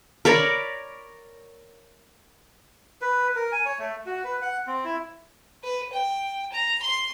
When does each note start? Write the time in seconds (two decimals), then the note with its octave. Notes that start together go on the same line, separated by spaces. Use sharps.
0.25 A#4 C#5 D5 B5
3.02 B4
3.35 A#4
3.52 G#5
3.66 C#5
3.79 A3
4.06 F#4
4.24 B4
4.42 F#5
4.67 C4
4.84 E4
5.63 B4
5.93 G5
6.52 A#5
6.82 C6